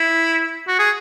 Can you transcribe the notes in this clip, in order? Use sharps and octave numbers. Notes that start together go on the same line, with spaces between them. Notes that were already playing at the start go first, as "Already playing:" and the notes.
Already playing: E4
F#4
G#4